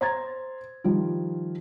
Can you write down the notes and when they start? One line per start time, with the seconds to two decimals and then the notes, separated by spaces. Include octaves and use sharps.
0.01 C5 A#5 G#6 A6
0.84 D#3 F3 G3 F4